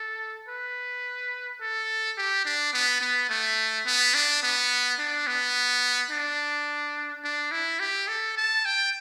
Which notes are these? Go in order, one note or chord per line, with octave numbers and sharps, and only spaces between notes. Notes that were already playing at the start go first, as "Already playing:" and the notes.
Already playing: A4
B4
A4
G4
D4
B3
B3
A3
B3
D4
B3
D4
B3
D4
D4
E4
G4
A4
A5
G5